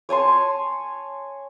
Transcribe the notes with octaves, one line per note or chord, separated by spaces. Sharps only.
C#5 G#5 A5 C6